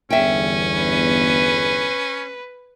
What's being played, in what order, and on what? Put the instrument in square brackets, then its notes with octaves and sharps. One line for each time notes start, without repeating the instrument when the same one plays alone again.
[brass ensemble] G1 E2 [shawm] C#4 [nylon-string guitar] E5 G5
[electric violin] B4